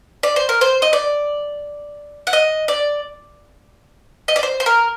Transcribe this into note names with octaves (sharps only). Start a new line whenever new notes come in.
D5
C5
A#4
C5
D#5
D5
F#5
D#5
D5
D#5
D5
C5
C5
A#4